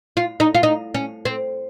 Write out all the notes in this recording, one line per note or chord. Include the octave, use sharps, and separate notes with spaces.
F4
D#4
F4
D#4
C#4
C4